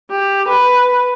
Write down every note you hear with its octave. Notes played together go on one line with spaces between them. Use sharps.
G4
B4